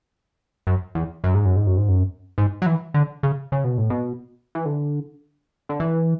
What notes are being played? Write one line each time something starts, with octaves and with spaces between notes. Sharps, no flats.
F#2
E2
F#2
G#2
F#2
G#2
F#2
G#2
F#2
G#2
F#3
E3
D3
C#3
C#3
B2
A2
B2
E3
D3
D3
E3